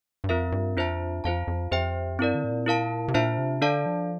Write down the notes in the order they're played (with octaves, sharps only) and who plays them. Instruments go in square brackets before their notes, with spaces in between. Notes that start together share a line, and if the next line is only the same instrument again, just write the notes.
[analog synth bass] G2
[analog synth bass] F2 [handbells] C4 F4 A#4 E5
[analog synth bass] G2
[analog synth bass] F2 [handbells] D4 F4 C5 E5 A5
[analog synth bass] F2 [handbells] F4 C5 F5 A5
[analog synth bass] F2
[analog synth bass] F2 [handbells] G4 C5 E5 G5
[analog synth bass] G2 [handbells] C4 E4 A#4 D5
[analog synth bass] D3
A2
A#2
[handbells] E4 A#4 F5 A5
[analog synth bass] C3
[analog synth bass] A#2 [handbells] D4 F4 C5 E5 A5
[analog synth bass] C3
[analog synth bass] D3 [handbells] D4 A4 D5 F5 A5
[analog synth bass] F3